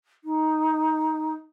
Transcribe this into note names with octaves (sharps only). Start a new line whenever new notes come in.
D#4